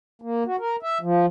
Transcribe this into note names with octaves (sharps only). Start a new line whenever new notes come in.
A#3
F#4
A#4
E5
F3